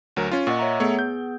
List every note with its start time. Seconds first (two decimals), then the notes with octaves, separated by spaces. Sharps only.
0.16 D2 F#3 A#4
0.31 C#4 F4
0.47 A#2 D#5 F#5 C#6
0.59 C#5 E5 A#5
0.80 A3 B3 G#4 C#5
0.99 G6